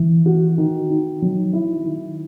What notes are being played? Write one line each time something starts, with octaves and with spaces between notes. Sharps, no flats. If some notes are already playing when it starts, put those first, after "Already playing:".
Already playing: E3
F#4
D#3
D#4
F#3
E4
D#3